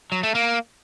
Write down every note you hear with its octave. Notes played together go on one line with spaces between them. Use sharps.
F#3
A3
A#3